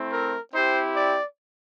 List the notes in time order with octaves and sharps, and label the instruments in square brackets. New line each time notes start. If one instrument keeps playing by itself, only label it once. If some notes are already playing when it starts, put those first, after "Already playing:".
Already playing: [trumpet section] A3 C4 E4
A#4
C4 E4 G4 C5
D5